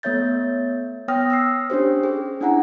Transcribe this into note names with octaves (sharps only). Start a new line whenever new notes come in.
A3 B3 C#5 E5 G6 A6
B3 C#5 G5 D#6 F6 A#6
E6 F6 C7
C#4 D4 G4 C5
G#4
C#4 D4 E4 F#5 G#5 A#5